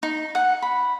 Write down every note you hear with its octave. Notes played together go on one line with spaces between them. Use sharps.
D#4
F#5
B5